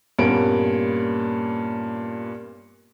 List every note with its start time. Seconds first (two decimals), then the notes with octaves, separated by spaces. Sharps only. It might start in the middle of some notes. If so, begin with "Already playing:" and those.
0.19 G2 A#2 A#3 B3 C#4 D7